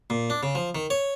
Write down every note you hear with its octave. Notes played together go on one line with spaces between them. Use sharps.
A#2
D4
C#3
F3
D#3
C#5